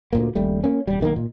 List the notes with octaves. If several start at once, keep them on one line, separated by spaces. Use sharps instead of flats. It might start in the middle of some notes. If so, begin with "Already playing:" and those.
D2 A#2 A#3
D#1 A#1 G3 A3
A#3 C#4
D#1 G3
B1 D#3 E3 A#3
A#2